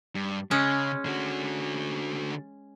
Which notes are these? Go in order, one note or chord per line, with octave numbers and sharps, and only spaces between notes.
G2
C#3 G#3 C#4
D3 F#4